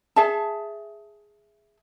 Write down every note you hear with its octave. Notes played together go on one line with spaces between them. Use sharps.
G#4 E5 A5